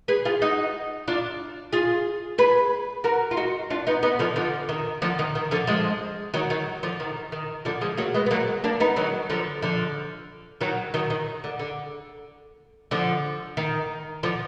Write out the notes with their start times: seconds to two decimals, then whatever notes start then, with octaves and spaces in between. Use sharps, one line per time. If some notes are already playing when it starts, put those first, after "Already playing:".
0.08 G#4 B4
0.25 F4 G#4
0.42 D#4 F#4
1.08 D4 F4
1.72 F4 G#4
2.38 G#4 B4
3.04 F#4 A#4
3.31 F4
3.37 D#4 F#4
3.70 D4 F4
3.87 B3 D#4
4.03 B3 D#4
4.19 D3 F3
4.36 D3 F3
4.69 D#3
5.02 D3 F3
5.19 D#3
5.35 D#3
5.51 D3 F3
5.67 F3 G#3
6.34 D#3 F#3
6.50 D#3 F#3
6.83 D3 F3
7.00 D#3
7.32 D#3
7.65 D3 F3
7.81 F3 G#3
7.97 F#3 A#3
8.14 G#3 B3
8.26 B3
8.31 F#3 A#3
8.64 A#3 D4
8.80 B3 D#4
8.96 D#3 F#3
9.30 D3 F3
9.62 D3 F3
10.61 D#3 F#3
10.94 D#3 F#3
11.10 D#3
11.44 D3
11.59 D3
12.91 D3 F3
13.57 D#3
14.23 D3 F3